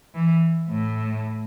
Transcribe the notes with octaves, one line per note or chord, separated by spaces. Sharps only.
E3
A2